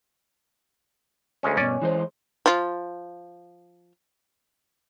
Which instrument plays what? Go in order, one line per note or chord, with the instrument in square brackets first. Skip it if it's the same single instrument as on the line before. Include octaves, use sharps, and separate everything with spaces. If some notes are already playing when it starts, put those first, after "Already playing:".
[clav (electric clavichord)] D2 G#3 C#4
[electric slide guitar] G2 B2 [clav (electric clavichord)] C#4 D5
[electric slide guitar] E3 G#3 C5
[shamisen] F3 F4